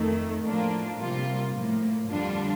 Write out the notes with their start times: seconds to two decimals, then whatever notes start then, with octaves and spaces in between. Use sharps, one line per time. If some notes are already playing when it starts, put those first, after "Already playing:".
Already playing: F2 D#3 A3
0.44 A2 F3 A#3 D4 F4
0.98 C3 G3 A#3 F4
1.54 A2 F3 A#3
2.09 F2 D3 G3 D4 F4